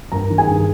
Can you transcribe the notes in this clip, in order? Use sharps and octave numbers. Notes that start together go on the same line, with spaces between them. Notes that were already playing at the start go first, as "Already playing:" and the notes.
G2 A#4 A#5
D#3
G#4 G#5
G2